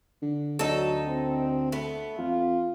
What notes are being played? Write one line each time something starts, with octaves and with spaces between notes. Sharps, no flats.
D3
D2 F#3 D#4 A4
C4
A3 B3
F2 F4